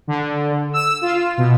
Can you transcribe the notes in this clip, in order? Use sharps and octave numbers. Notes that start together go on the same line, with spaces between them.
D3
E6
F4
B2